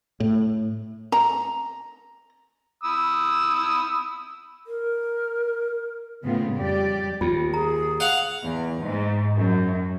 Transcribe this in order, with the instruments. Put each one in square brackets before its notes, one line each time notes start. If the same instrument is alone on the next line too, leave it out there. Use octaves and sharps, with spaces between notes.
[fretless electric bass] A2
[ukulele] A#5
[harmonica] B5 D#6 E6
[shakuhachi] A#4
[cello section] A2 C#3 B3 C4 F4
F2 G3 G4 D5
[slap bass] D#2 [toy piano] F4
[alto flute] G#4 [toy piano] A#5
[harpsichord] F5 F#5
[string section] E2
G#2
F#2